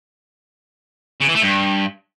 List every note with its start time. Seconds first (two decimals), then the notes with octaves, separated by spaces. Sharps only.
1.20 C#3
1.28 E3
1.35 A3
1.42 G2